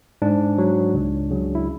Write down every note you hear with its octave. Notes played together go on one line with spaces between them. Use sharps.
G#2 D4
F#3
C#2
C#3 F#3
E4